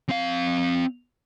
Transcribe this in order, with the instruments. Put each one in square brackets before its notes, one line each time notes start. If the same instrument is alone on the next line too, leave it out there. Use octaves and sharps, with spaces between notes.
[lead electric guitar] C4 F5